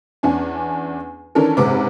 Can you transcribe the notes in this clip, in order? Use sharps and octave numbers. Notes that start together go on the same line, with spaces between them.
E2 C#4 D4 G#5
D#3 E3 C#4 D4 A4 A#4
F#1 G#2 C3 B4 D6